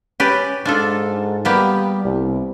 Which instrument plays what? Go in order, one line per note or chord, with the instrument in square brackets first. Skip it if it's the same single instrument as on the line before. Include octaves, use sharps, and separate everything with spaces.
[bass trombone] C#4 [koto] G4 B4 D5
[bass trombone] G#2 [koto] D4 F4 A4
[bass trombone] G3 [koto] A#3 B3 G4
[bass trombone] C2